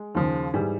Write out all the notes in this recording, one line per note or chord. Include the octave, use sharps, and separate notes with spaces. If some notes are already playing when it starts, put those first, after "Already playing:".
Already playing: G#3
D#2 C#3 F3
G#2 E3 G3